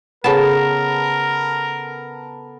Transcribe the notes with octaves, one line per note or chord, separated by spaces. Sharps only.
C#3 B3 A4 A#4 A5